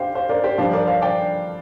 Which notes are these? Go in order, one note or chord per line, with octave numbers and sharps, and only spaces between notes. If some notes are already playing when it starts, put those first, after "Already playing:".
Already playing: D4 G4 C5 F5 G5
C5 F5
A#4 D5
G4 C5
G2 F3 D4 C5 F5
A#4 D5
C5 F5
D5 G5